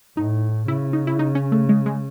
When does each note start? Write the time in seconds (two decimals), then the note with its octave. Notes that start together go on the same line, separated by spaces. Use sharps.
0.17 A2 D#4
0.68 C#3 E4
0.93 D#4
1.07 E4
1.19 D#4
1.35 C#4
1.52 A3
1.69 G#3
1.86 G#3